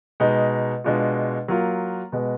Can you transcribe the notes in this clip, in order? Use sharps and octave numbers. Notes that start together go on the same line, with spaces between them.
B2 G#3 D#4
B2 G#3 D4 F4
F#3 A#3 F4
B2 G#3 B3